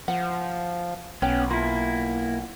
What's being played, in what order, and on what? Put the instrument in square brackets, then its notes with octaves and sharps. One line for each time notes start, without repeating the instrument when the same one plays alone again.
[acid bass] F3 [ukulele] F#5
[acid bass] B1 [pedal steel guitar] B3 C#4 [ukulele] G5
[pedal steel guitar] A#3 E4 [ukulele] F4